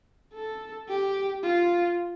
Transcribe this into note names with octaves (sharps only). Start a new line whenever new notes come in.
A4
G4
F4